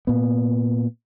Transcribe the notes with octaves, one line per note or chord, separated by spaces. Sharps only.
A#2 B3